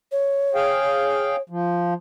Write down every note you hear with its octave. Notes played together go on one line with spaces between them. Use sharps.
C#5
G#4 F5 G5
F3